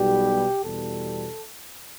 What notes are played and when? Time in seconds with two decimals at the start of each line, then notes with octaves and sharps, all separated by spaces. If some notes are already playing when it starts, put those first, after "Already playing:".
Already playing: B1 B2 G3 G4
0.64 E2 B2 G3 A4